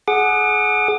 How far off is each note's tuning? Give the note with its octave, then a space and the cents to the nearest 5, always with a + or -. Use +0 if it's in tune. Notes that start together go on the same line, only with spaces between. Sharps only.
G#4 +25 F#5 +0 D6 +40